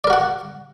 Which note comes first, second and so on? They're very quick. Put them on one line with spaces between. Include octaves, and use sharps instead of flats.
D5 A#4 F#4 F#5